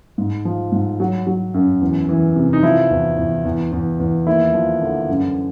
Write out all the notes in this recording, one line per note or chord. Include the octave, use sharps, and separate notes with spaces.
G#2
F3
G#2
F#3
F#3
F#2
E2
E3
C3
D#4
F3 E4
E2
E2
E2
E2
E2
D#2 E4
F3
D3
F#2